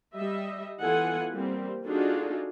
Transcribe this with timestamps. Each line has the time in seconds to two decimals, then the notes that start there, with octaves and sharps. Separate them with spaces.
0.15 G3 D#5 E5
0.80 E3 B3 F4 A4 F#5 G#5
1.34 G3 A#3 C4
1.86 D4 D#4 F4 F#4 G#4 A4